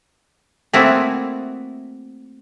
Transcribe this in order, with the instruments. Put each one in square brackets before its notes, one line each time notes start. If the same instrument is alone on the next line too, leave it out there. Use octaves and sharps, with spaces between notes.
[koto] A3 A#3 C4 E4 F#4 G#4